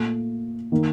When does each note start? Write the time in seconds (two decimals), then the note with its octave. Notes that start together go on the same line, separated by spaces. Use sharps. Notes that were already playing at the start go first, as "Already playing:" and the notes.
Already playing: A#2 A3
0.72 D#3 A#3